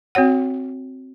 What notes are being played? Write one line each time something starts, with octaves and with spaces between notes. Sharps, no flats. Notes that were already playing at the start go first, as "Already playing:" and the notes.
C4 F#4 C#5 F#5